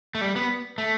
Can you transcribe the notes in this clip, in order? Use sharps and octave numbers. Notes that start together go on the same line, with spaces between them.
A3
G3
B3
A3